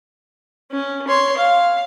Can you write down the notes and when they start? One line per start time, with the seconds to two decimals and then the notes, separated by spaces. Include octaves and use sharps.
0.71 C#4
1.08 C#5 C6
1.37 F5